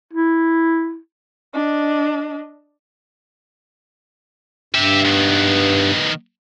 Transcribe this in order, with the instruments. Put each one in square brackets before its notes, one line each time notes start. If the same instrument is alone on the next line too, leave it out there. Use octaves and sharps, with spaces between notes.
[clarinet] E4
[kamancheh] D4 D#5
[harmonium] G2 [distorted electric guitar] G4 E5
[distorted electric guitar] D#3 B3